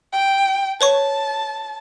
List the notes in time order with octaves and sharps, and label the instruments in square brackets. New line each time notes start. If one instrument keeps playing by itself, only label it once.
[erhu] G5
[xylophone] B4 C#5 C#6 [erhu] A5